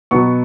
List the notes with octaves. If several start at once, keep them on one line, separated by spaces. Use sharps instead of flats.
B2 F#3 B3 C#6